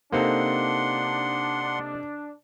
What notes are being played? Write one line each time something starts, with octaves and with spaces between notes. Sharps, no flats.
C3 A#3 C4 D4 D#4 A4 F#5 C6